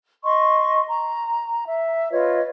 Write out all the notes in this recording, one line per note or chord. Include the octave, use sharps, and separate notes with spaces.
D#5 C6 C#6
A#5
E5
F4 B4 C#5 D#5